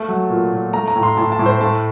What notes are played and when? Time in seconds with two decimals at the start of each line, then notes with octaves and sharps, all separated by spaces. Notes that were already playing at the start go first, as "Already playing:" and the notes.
Already playing: A3
0.08 F#3
0.30 A#2
0.52 A#2
0.73 A3 A#5
0.88 A#5
0.96 A2
1.03 C6
1.17 A2 A5
1.32 A5
1.39 A2
1.46 C5
1.61 A3 A5